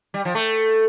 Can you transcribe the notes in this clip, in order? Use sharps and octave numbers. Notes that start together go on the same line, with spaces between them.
G3
F3
A3